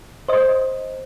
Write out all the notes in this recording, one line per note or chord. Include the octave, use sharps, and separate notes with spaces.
C5 D#5